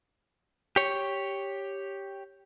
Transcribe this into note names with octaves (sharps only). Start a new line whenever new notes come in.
G4 C#5